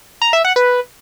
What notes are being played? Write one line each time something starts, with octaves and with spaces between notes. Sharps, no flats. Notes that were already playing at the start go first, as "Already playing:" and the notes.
A#5
E5
F#5
B4